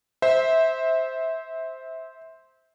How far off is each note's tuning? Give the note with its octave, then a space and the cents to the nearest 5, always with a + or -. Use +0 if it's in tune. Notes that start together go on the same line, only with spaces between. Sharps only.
C5 +0 E5 -20